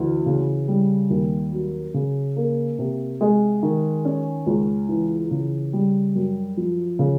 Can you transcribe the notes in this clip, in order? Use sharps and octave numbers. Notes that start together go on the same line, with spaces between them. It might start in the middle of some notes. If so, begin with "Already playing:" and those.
Already playing: D2 E3
C#3
G3
D#2
F#3
C#3
A#3
C3
G#3
D#3
C#4
C#2
E3
C#3
G3
F#2
F3
C#3